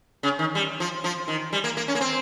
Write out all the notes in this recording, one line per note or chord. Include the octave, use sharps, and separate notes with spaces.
C#3
D#3
G3
F3
F3
D#3
G3
A#3
A#3
C#4
A#3
C4